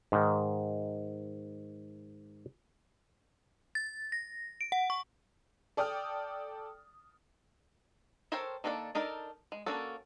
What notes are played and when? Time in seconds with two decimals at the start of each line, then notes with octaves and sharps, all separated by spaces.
0.12 G#2 D#3
3.75 A6
4.12 A#6
4.61 D7
4.72 F#5
4.90 C#6
5.77 A4 D5 G5 D#6 F6
8.32 A4 A#4 C5 C#5 G5
8.64 D#3 A#3 D4 A4 D5
8.95 D4 D#4 A4 A#4
9.52 G#3
9.66 A#3 C#4 D4 F#4 A4